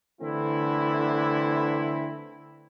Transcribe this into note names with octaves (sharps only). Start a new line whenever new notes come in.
D3 E3 A3 C4 E4